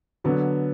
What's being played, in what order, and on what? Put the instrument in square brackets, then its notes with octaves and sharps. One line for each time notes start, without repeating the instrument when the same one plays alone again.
[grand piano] D3 F#3 B3